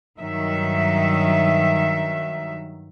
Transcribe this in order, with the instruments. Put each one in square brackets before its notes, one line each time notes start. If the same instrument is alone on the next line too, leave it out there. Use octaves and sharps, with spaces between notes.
[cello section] G2 D#3 F#3 E5